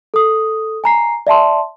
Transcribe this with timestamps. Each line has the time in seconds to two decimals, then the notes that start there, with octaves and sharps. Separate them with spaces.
0.14 A4 D#6
0.84 G#5 A#5 C7
1.27 D5 E5 A5 C6